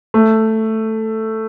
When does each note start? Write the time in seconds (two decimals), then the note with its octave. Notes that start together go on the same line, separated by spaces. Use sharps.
0.14 A3